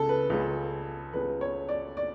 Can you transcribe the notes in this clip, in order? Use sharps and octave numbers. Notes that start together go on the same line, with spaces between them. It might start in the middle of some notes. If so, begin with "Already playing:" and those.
Already playing: C#2 C#3 A4
B4
C#2 C#3
C#2 C#3 B4
C#5
D5
D5